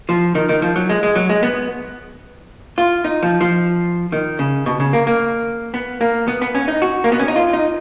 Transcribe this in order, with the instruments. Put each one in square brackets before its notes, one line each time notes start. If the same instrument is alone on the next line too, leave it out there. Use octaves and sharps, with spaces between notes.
[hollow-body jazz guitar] F3
D#3
D#3
F3
F#3
G#3
G#3
F#3
G#3
B3
F4
D#4
F3
F3
D#3
C#3
B2
C#3
A#3
A#3
B3
A#3
B3
B3
C#4
D#4
F#4
A#3
B3
C#4
D#4
F4
D#4